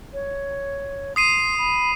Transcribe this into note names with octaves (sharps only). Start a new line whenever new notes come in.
C#5
C6 D#6 C7 D#7
B5